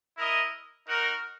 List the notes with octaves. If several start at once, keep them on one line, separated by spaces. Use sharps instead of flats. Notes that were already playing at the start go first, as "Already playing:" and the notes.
E4 A#4 D#5
D#4 F#4 A#4